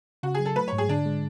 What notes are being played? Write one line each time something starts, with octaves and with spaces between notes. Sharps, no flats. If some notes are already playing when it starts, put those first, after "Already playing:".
C#3 F#4
G#4
F#3
A4
A3 B4
C#5
G#2
G#4
D3 D4
G#3